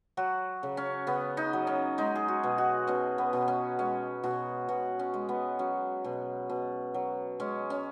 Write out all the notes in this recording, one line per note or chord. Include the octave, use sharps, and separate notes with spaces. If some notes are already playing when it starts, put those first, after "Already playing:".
F#3 F#4
C#3
C#4
C#3 B3
D#4
F#3
C#4
G#3 D#4
G#4
F#4
B2
F#4
B2 C#4
B3
B2
C#4
G#3 C#4
B2 F#4
B2 F#4
C#4
G#3
B3
F#3 C#4
B2
B2
F#3
G#3 C#4
C#4